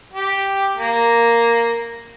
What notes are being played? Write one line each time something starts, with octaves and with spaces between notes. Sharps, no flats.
G4
A#3